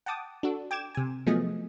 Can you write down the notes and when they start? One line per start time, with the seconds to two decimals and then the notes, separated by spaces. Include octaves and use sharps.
0.06 F#5 G5 A5 D6 D#6
0.43 D4 F#4 A4
0.71 G5 D6 G#6 E7
0.95 C3 G#5
1.27 F3 F#3 A3 B3 G#4 D#5